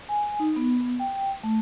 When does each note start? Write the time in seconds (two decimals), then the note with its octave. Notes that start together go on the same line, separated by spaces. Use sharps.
0.09 G#5
0.40 D#4
0.56 B3
0.99 G5
1.44 A3